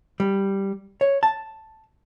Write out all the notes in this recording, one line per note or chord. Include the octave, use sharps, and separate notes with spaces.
G3
C#5
A5